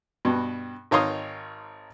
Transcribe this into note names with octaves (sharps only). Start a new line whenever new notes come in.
G2 B2
G#1 D#4 C#5 F5 C6 D#6